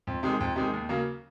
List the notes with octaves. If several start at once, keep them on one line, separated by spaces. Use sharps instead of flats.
F2
C3 D#3 G#3
F2
C3 D#3 G#3
D#2
C#3 F#3 A#3